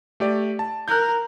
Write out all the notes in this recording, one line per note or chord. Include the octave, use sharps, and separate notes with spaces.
A3 G4 D5
A5
A#4 F#6 G6